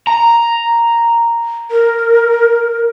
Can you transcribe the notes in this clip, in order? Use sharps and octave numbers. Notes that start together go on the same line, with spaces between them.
A#5
A#4